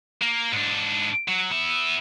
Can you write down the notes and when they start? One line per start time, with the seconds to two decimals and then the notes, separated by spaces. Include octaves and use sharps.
0.22 A#3
0.53 G#2 D4
1.28 F#3
1.50 B3 E5